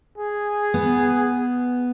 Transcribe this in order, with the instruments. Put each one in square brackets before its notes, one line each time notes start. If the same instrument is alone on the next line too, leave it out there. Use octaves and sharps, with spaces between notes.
[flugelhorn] G#4
[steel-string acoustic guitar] B3